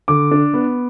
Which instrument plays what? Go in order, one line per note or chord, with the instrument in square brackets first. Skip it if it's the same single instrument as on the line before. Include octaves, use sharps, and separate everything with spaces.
[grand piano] D3 D6
D4
B3